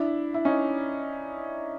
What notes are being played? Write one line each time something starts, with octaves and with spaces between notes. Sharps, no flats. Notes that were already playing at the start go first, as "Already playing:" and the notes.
Already playing: D4 E4
E4
C#4 D#4